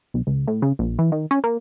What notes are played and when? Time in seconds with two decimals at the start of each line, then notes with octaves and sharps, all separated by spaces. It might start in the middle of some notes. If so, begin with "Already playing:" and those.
0.14 B1
0.27 C#2
0.48 A2
0.62 C#3
0.79 A#1
0.99 E3
1.12 D#3
1.31 C#4
1.44 A#3